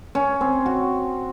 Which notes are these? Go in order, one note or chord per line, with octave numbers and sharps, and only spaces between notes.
C#4
C4
F#4